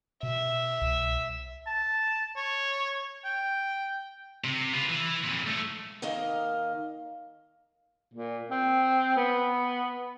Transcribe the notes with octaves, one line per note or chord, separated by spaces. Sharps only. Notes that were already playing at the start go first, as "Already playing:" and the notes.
B2 E5
C2
A5
C#5
G5
C3
F4 B4
E3
F2 A#2
G#2 A3
D#3 A#3 A#4 D#5 F5
A#2
C4
B3